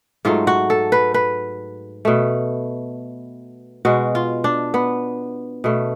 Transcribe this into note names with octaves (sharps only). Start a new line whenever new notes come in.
G#2 F#3 A3 F4
F#4
A4
B4
B4
B2 A3
B2 G#3 F#4
F4
D4
B3
B2 A3